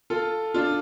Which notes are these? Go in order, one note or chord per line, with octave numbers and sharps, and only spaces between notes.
F4 A4
D4 F4